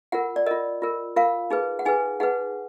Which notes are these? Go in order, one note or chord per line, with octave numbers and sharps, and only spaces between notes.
F4 A#4 F#5
D5
F4 A#4 D#5
F4 A#4
F4 A#4 F5
D#4 G#4 B4
F#5
D#4 G#4 B4 G#5
D#4 G#4 B4 F#5